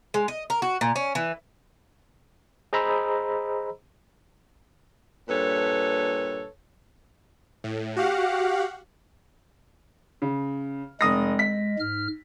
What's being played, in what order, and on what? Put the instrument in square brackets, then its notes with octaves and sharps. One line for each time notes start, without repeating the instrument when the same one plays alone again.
[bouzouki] G#3
D#5
A#4
F#4
A#2
C#4
E3
[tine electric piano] G#4 C5 D#5 A#5 B5 E6
[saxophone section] G2 A#2 A4 B4 C#5
[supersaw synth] A2
F#4 G4 F5 F#5
[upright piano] C#3
[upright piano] F1 D#6 A#6 [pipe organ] G#3
[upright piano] B6
[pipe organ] G#2 F6